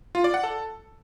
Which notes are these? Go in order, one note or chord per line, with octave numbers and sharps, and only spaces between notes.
F4
D5
F#5
A4